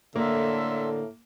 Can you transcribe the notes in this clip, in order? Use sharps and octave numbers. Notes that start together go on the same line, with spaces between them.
A2 D3 A#3 E5 C6 E6